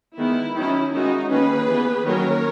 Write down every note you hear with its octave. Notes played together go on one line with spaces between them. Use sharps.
D#3 G#3 B3 E4
D#3 F#3 C#4 E4
D#3 G#3 C#4 D#4 F#4
D#3 A#3 C#4 G#4 B4
E3
B3
D#3 F#3 A#3 C#4 A#4 C#5